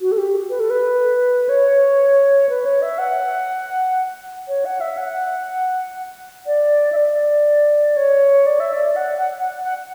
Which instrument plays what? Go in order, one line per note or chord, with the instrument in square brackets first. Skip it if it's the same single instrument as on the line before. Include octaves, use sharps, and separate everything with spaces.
[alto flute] F#4
A4
G4
B4
A4
B4
C#5
B4
C#5
E5
F#5
C#5
F#5
E5
F#5
D5
E5
D5
C#5
D5
E5
D5
F#5
F#5
F#5
F#5